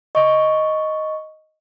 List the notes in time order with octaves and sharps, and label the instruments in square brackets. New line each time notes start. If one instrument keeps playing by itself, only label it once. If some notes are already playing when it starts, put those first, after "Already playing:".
[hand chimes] D#5 C#6